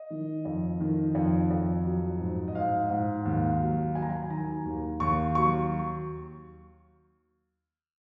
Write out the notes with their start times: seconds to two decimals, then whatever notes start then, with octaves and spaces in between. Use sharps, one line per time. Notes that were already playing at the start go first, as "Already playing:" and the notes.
Already playing: D#5
0.10 D#3
0.45 F2
0.80 D#3
1.15 F2
1.50 F2
1.85 F#3
2.20 G#2
2.48 D#5
2.55 G#2 F5
2.90 G#2
3.25 D#2
3.60 F#3
3.95 F#3 G#5
4.02 A#5
4.09 G#5
4.30 D#3 A#5
4.65 D#2
5.00 D#2 C#6
5.35 F#3 C#6